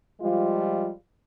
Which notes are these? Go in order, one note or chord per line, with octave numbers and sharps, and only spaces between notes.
F3 G3 G#3 F4